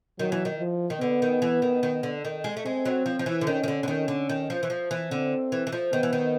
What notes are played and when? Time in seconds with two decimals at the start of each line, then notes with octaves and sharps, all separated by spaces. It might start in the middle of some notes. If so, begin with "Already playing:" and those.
0.19 D#3 F#3
0.32 E3
0.45 D#3
0.59 F3
0.90 D#3
1.00 D3 B3
1.22 D#3
1.42 E3
1.62 D#3
1.83 D#3
2.03 D3
2.25 D#3
2.44 G#3
2.57 A3
2.65 G#3 C4
2.85 F#3
3.06 F3
3.19 F3
3.26 E3
3.41 D3
3.46 D#3 C#4
3.63 D#3
3.68 D3
3.83 D3
3.88 D#3
4.08 D3
4.29 D#3
4.50 F3
4.63 E3
4.70 F3
4.91 E3
5.11 D3 C4
5.52 E3
5.67 E3
5.72 F3
5.93 D#3 B3
6.03 E3
6.13 D#3